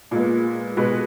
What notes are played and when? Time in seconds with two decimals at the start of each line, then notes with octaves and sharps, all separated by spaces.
0.11 A#2 G#3 B3
0.77 B2 G#3 B3 F#4 B4